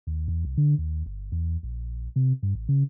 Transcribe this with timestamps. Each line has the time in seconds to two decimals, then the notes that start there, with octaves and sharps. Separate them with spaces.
0.07 D#2
0.28 E2
0.45 C2
0.57 D3
0.78 D#2
1.06 G1
1.32 E2
1.63 A#1
2.16 C3
2.43 G2
2.55 A1
2.68 C#3